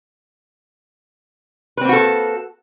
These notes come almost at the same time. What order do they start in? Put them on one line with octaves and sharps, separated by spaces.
B4 C4 A#3 F#4 A4